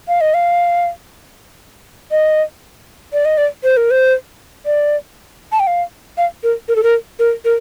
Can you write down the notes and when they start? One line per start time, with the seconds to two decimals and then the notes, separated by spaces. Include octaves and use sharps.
0.08 F5
0.21 D#5
0.34 F5
2.11 D#5
3.13 D5
3.25 D#5
3.38 D5
3.64 C5
3.77 A#4
3.91 C5
4.66 D5
5.52 A5
5.60 G5
5.67 F5
6.18 F5
6.43 A#4
6.68 A#4
6.76 A4
6.83 A#4
7.19 A#4
7.45 A#4